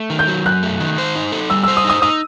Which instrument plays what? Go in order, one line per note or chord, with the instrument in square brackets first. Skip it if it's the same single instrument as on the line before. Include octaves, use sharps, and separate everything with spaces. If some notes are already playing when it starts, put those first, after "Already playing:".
Already playing: [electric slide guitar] A3
D#3
[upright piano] G6
[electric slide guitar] F#3
[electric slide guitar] F#2 [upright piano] F#6
[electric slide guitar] A3
D#3
C5
D#4
A4
[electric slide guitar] G3 [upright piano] E6
[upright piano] E6
[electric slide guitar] C5
[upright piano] D#6
[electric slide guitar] D#4
[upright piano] D#6
[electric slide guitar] D#4 [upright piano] D#6